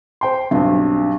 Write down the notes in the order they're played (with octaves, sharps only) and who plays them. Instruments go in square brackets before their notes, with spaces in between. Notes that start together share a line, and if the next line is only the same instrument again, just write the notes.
[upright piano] C5 G5 C6
[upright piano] B1 G2 [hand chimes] C4 D4